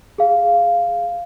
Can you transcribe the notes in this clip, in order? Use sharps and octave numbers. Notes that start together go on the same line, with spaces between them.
G#4 F5